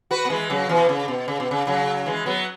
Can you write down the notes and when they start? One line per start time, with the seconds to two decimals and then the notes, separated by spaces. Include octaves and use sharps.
0.11 F#4 B4
0.25 B3
0.30 E3 G#3
0.50 C#3 F#3
0.69 B2 E3
0.89 C#3
1.08 B2
1.28 C#3
1.40 B2
1.51 C#3
1.67 C#3 F#3
2.06 E3 G#3
2.26 F#3 B3